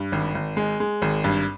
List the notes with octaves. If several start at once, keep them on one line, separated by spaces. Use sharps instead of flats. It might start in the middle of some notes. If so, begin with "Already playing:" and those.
Already playing: G2
G#1
G#1
G#3
G#3
G#1
G2